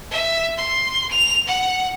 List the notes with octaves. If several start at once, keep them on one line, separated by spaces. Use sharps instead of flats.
E5
C6
F7
F#5